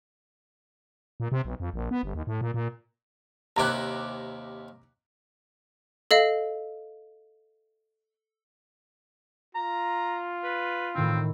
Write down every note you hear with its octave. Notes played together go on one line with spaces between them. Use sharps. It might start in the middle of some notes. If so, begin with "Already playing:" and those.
A#2
C3
B1
F2
A#1
B3
G1
D#2
A2
A#2
A#2
D#2 C3 E4 A#5 D6 F#6
A4 D#5 F5
F4 A#5
B4
A2 D#3 C4 E4